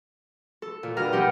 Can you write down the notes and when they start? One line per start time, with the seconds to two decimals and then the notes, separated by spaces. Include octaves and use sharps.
0.62 A4
0.83 A#2
0.97 G2 B2 A#5 D#6 F6
1.12 B3 C4 D#4 G4 F#5